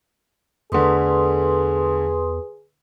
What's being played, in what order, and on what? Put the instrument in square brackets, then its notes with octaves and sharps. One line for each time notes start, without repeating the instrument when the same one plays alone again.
[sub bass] E2 [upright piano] D3 A3 [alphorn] G#4 [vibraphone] B4 C6 D#6